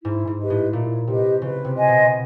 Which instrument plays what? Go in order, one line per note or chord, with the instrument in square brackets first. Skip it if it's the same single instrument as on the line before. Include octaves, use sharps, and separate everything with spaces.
[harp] G#2 [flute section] E4
[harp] G#2
[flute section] G4 B4 D#5
[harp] A2
[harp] A#2 [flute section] E4
[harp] C3 [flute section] G4 B4 D#5
[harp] C#3 [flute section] B4
[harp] C3
[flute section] D#5 G#5 C6
[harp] B2